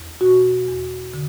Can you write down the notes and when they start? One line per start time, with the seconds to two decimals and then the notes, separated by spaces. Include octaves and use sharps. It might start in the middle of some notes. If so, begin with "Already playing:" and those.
Already playing: E2
0.21 B2 F#4
0.68 E2
1.14 D3